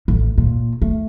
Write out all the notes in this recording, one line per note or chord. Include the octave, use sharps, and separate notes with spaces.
A1
A#2
A3